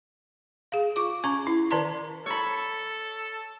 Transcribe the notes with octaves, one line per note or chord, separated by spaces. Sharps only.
G#4 F5
F4 C#6 D6
C#4 A#5 C#6
E4
D#3 A#4 D5 A5 A#5 C6
A4 C#5 B5